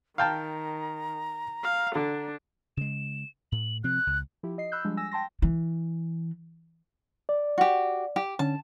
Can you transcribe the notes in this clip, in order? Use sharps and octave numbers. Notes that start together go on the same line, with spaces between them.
D#3 F5 G5 A5 A#5
F5
D3 D4
C#3 G#3 E7
A2 F#7
C3 F3 C4 F#6
C#2
F3 E4 G4
D#5 C7
B5 E6 F#6 G6
F3 G3 G#3 D4
G#5 E6 A#6
G5 A5 C6 A#6
E3
D5
F#4 G4
G4
D3 C#4 A5